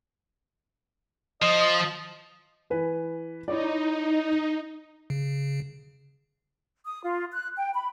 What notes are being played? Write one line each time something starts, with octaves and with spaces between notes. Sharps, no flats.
F3 D#5
E3 B4 G#5
D#4 E4 C#5 D5
C#3
D#6
F4
F#6
G5
B5